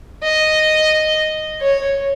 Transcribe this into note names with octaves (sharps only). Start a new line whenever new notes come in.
D#5
C#5